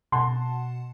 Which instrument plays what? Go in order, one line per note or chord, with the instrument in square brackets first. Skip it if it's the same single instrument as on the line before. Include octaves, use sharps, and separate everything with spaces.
[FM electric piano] B2 F#5 A5 [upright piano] C6